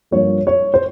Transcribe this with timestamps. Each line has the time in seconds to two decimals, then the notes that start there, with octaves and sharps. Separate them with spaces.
0.11 G2 F3 A#3 C#5
0.47 C#5
0.74 C5